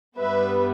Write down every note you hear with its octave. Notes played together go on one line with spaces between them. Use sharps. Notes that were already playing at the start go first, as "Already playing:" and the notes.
G2 G3 B3 B4 E5